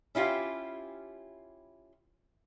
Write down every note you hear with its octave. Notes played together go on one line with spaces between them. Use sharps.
C#4 E4 F4 G4